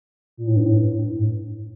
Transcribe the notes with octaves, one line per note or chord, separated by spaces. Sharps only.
A#2
A2
G2
A2
A2
G2
A2